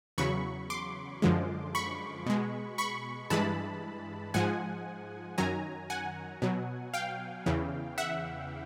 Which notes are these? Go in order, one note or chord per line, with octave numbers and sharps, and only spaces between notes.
E2 C#3 F#3 B5 C#6
C6 D6
F#2 D3 F3 G#3
B5 C#6
B2 G#3
B5 C#6
G2 E3 G#3 A5 B5
G#2 F3 G#3 F#5 G#5
F#2 D#3 F#3 G#5 A#5
F#5 G#5
B2 F#3
F5 G5
E2 C#3 E3
E5 F#5